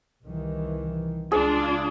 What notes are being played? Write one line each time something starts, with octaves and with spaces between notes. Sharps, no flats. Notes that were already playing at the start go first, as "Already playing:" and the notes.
C2 D#3 E3
C#2 D4 F4 G#4